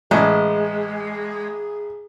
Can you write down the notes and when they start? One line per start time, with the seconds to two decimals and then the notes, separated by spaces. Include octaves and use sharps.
0.11 A1 G#3 G#4